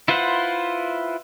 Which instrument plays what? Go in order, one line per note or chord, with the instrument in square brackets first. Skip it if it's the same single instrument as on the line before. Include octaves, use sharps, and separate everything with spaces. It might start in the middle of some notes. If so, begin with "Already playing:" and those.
[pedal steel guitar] E4 F4 B4 C5 F#5